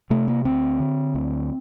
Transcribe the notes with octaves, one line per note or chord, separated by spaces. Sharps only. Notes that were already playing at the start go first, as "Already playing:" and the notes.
C3 A3
A#3
D2 C4
D3
D2